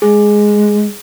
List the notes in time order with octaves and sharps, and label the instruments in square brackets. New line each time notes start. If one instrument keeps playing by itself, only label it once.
[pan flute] G#3 [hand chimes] G#4